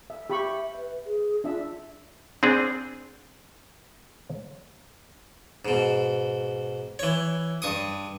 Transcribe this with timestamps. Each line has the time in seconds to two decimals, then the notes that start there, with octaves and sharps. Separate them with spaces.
0.10 E5
0.30 G4 E5 B5 C#6
0.76 B4
1.06 G#4
1.44 D4 F4 E5
2.43 C4 D4 G#4
5.65 G#2 B2
6.99 E3 C#5
7.62 G2 C#6 D#6